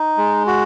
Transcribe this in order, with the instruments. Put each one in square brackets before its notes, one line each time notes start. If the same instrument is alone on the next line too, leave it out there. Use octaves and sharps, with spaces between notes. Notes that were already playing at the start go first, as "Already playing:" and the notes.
Already playing: [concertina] D#4
G#3
F#4